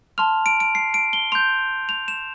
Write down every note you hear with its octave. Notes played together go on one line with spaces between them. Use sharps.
A5 C6 F6 F7
D7
D7
C7
D7
G7
C6 G6 F7
F7
E7